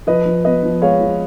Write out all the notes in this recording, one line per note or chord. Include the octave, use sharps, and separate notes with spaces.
F3 B4 D#5
F3
B3 B4 D#5
F3
G#3 C#5 F5
F3